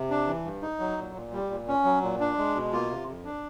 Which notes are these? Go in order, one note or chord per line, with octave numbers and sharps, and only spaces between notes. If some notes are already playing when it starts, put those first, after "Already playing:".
Already playing: C3
D4
E3
G2
D#4
F#3
A#2
A#2
G3
A#2
C#4
F#3
A#2
D4
G#3
B2
A#3 F4
C3
F2
D4